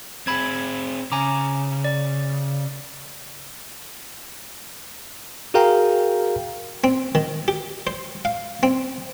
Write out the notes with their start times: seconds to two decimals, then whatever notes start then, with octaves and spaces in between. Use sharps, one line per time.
0.27 C4 G#4 B5 G#6
1.12 C#3 G#5 A#5 D6
1.84 D5
5.54 F#4 G#4 A#4 F5 G5 A#5
6.84 C4
7.15 D#3
7.48 G4
7.87 C5
8.25 F5
8.63 C4